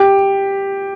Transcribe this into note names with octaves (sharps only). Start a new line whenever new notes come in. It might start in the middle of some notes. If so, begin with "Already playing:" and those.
Already playing: G4